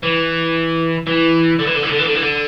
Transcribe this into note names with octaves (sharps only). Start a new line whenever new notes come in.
E3
E3
D3
E3
D3
E3
D3
E3
D3
E3
D3